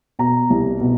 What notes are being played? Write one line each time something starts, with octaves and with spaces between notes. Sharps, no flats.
B2 A#5
C2
B2